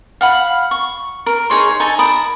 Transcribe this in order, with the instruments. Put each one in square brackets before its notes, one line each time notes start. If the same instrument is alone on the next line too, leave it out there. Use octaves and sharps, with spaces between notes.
[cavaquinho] F5 F#5 B5
C#6
A#4
D#4 G#4 C#5 C6
D#4 A4 G#5 A5
A#4 A5 B5 D#6